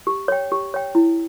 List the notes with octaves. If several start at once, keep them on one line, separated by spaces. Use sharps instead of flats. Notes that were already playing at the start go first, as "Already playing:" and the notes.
G4
C#5 G5
G4
C#5 G5
E4